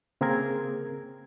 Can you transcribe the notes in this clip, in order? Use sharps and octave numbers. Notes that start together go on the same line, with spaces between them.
C#3 A#3 C4 G#4 A#4 G#6